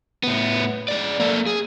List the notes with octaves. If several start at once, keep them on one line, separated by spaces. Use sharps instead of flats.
A2 B3
G#3 D5
A#3 A4
G#4